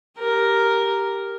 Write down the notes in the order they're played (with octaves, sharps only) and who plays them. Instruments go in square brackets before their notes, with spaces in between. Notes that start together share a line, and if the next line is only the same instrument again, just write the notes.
[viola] G4 A#4